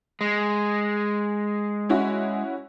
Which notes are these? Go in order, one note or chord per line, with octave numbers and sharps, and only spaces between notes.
G#3
C#4 E4 F#4